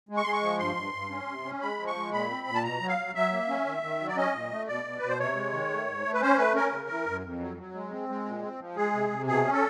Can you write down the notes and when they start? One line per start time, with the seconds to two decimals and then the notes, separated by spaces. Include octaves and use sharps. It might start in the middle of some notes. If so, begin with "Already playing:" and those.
0.09 G#3
0.17 C#6
0.24 G#3 C6
0.33 C#6
0.42 F3
0.59 G2 C6
0.76 G2
0.94 G2
1.10 C#4
1.28 C3
1.45 C#4
1.61 G#3 B5
1.79 F3
1.87 C#6
1.95 G#3
2.12 A#2 B5
2.29 C4
2.47 A#2
2.55 A5
2.63 B2 A#5
2.80 F#3
2.89 F5
2.98 F#3
3.15 F#3 E5
3.32 A#3
3.49 C#4
3.66 D#3
3.83 D#3
4.00 F#3
4.07 D5
4.17 C#4 D#5
4.34 A#2
4.51 A3
4.67 B2 D5
4.84 B2
4.98 B2 B4
5.08 C5
5.19 C3 C#5
5.36 G#3
5.52 D#3
5.70 A3
5.87 G#2
6.05 A3
6.14 B4
6.21 C#4 C5
6.38 A3 B4
6.55 C#4 A#4
6.72 C#3
6.89 E3
7.06 F#2
7.23 F2
7.40 F#3
7.57 F#3
7.74 G#3
7.91 C4
8.09 G#3
8.25 A#2
8.42 C4
8.59 F3
8.76 G#3 G#4
8.93 C3
9.10 C3
9.27 B2 G#4
9.44 C#4
9.53 A4